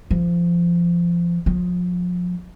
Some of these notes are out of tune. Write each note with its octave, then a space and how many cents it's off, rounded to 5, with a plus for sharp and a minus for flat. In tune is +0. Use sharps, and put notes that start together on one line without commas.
F3 -20
F3 +35